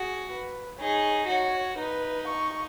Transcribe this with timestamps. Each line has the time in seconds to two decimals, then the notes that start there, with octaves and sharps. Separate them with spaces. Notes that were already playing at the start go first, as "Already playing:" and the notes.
Already playing: F#4 G#4
0.31 B4
0.80 D#4 G#4 C#5
1.29 F#4 C#5
1.79 D#4 B4
2.28 C#6